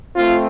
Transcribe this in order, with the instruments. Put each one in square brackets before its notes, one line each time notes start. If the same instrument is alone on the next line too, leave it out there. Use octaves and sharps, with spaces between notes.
[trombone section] A3 C4 F4